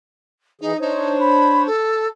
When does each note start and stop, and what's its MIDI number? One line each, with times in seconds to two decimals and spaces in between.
0.61 0.73 52
0.61 0.79 63
0.61 0.73 68
0.81 1.67 62
0.81 1.16 63
0.81 1.67 72
0.81 1.67 73
1.20 1.63 83
1.67 2.07 69